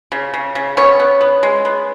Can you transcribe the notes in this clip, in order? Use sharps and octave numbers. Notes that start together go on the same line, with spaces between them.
C#3
C#3
C#3
B3 C#4 C#5
B3
B3
G#3
B3